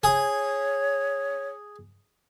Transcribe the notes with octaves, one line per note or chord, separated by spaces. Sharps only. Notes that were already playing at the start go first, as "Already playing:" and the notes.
G#4 C#5 D#6